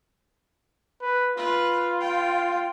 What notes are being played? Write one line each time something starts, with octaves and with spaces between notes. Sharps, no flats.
B4
F4 B4
G5